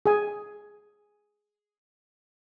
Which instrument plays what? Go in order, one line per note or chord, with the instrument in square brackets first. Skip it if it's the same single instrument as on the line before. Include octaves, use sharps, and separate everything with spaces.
[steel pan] G#4 G#5